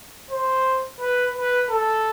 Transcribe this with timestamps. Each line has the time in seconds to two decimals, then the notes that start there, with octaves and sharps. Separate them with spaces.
0.31 C5
1.01 B4
1.36 B4
1.70 A4